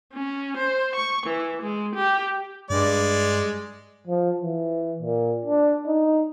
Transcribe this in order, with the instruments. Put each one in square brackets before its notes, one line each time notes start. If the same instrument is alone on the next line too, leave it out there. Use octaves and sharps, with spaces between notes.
[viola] C#4
C5
C#6
E3
G#3
G4
[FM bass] G2 [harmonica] G#3 D5
[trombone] F3
E3
A#2
D4
D#4